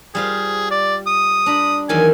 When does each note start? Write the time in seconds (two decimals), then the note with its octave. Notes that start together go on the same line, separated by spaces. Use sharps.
0.15 G3 F4 G#4 C5
0.71 D5
1.07 D#6
1.46 D4 A#5 B5
1.89 E2 D#3 F#3 G#5